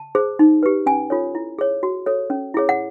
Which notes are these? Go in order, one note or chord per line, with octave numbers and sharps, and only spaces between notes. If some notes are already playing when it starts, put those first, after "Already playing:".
Already playing: A5
G#4 C5
D#4
G4 B4
C#4 G#5
F4 A4 C#5
E4
G#4 C#5
F#4
A4 C#5
C#4
E4 G#4 C#5
F#5